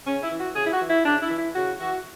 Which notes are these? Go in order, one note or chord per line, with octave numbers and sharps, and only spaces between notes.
C#3 C#4
E4
E3
F#4
C#3 G#4
E4
F#4
E3
E4
C#3 D4
E4
E3
E4
C#3 F#4
E3 F#4